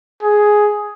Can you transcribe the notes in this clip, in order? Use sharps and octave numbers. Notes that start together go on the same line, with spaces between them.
G#4